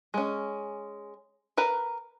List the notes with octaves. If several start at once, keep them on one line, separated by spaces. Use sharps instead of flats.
G#3 C#4
A#4 B4 A#5